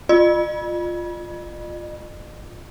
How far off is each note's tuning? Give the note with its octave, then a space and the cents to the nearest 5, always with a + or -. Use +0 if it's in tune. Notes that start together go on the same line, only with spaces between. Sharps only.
F4 +0 D#5 -45